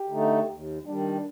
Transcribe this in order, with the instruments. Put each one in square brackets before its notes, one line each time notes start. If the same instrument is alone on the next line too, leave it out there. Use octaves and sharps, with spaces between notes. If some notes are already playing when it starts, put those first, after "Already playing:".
Already playing: [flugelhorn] G4
[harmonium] D3 A3 D#4
D#2
[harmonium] D#3 G3 [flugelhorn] D4